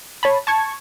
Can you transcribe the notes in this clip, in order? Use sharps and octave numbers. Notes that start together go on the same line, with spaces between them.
C#5 A5 B5
A5 C#6 G#6